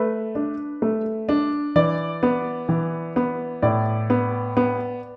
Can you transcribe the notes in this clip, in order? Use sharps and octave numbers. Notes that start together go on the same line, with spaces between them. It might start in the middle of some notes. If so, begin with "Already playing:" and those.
Already playing: A3 B4
D4
A3
D4
E3 D5
B3
E3
B3
A2 D5
B3
B3